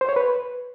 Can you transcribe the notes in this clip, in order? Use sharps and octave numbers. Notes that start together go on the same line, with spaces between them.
C5
C#5
B4